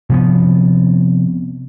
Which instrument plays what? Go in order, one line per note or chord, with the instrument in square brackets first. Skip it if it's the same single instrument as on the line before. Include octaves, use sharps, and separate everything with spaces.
[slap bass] C3 F3 B3